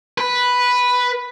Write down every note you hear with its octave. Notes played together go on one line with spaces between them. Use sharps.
B4